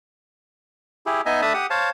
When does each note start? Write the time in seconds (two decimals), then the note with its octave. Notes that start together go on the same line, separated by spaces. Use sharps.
1.06 E4 G4 G#4
1.26 B3 D#4 D#5 E5 G#5
1.42 A3 D4 E5 A5 B5 D#6
1.54 G4 F#5 D#6
1.70 C5 C#5 F5 A5